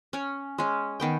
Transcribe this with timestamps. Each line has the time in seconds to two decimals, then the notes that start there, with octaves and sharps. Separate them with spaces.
0.13 C#4 C#5
0.58 G#3 C#4
1.00 D#3 B3 G5